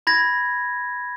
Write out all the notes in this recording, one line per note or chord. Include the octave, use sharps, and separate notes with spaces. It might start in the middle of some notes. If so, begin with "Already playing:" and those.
B5 G#6 A#6